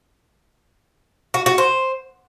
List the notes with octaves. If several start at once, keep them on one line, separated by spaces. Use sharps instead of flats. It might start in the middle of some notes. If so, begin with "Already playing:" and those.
F#4
F#4
C5